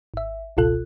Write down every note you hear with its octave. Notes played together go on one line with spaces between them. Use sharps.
G#1 E5
G#1 C#2 B2 F4 A4 F#6